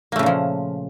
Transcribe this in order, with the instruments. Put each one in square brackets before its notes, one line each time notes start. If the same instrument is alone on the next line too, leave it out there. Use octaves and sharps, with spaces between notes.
[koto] A#3
A3
C#3
A#2
F3